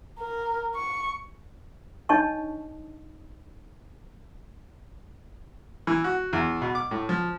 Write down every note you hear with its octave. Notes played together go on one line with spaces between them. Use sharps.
A#4
C#6
D4 D#4 C#5 D#5 A5 C#6
E3
F#4
E2
B2
D6
A2
F3